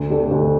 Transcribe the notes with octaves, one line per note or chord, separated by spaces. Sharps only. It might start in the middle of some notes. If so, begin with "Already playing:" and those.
Already playing: D2
D3 A3 D4 G4
D2